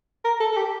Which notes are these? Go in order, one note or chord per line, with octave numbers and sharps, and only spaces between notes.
A#4
A4
A4
G4